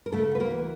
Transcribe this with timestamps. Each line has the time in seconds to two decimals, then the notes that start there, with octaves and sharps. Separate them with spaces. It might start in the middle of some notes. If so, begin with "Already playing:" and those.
0.06 A#4
0.12 C#3 A3 A4
0.31 D2 B4
0.40 A#3 A#4
0.50 E3